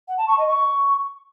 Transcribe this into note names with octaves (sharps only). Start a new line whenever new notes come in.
F#5
A5
C#6
D#5
C#6